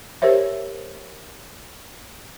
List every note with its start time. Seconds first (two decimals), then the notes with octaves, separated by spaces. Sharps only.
0.22 G4 A#4 C5 C#5 E5